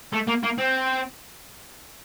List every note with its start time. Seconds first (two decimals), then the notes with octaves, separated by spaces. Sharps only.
0.13 A3
0.27 A#3
0.43 A#3
0.59 C4